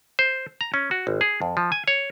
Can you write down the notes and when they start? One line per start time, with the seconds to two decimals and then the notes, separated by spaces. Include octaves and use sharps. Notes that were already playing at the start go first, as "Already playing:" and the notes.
0.19 C5
0.61 A#5
0.74 C#4
0.91 F#4
1.07 G#1
1.21 G#4
1.42 F2
1.57 F3
1.72 G#5
1.88 C#5